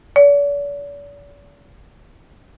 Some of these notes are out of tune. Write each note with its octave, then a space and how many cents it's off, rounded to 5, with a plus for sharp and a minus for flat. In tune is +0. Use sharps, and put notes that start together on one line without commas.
D5 -45